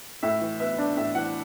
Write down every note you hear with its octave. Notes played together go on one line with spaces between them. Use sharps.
A2 E5
E3
B3 E5
D4
A2 E5
E3 F#5